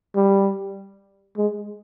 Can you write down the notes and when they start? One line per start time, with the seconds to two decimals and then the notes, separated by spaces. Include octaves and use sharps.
0.16 G3
1.37 G#3